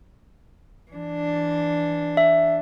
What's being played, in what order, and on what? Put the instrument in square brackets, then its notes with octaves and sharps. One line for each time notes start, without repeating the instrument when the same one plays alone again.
[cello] E3 D4
[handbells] E5